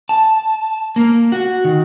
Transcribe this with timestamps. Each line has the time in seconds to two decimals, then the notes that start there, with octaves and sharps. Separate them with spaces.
0.09 A5
0.96 A#3
1.32 F#4
1.64 D#3